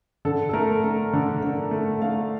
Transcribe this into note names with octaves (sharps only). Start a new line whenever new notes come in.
D3 A4
A4
A3 A#4
A3
D3
D3
A3
A3 F5